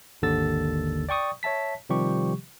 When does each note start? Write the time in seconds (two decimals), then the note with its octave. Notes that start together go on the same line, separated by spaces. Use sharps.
0.22 G#1 D#2 D3 A4 E6 A6
1.09 D5 G5 C#6 D#6
1.43 C#5 E5 A5 B6
1.89 C3 D#3 F3 G3 G4 C#6